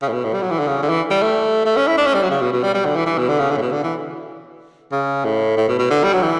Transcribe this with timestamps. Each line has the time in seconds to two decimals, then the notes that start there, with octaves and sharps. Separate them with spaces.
0.02 C#3
0.08 A2
0.13 B2
0.24 A2
0.34 G3
0.42 F#3
0.51 E3
0.59 D3
0.67 C#3
0.82 D3
0.89 E3
1.11 G3
1.22 A3
1.65 A3
1.77 C#4
1.87 E4
1.98 D4
2.07 C#4
2.14 G3
2.23 F#3
2.30 C#3
2.42 B2
2.53 B2
2.63 G3
2.74 G3
2.85 D3
2.96 E3
3.06 E3
3.18 B2
3.29 D3
3.39 C#3
3.50 D3
3.57 A2
3.61 B2
3.72 D3
3.83 E3
4.92 C#3
5.24 A2
5.57 A2
5.68 B2
5.79 B2
5.90 D3
6.03 G3
6.13 F#3
6.22 E3